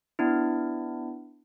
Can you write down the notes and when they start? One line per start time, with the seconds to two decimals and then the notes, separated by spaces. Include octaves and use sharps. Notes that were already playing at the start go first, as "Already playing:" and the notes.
0.19 B3 D4 E4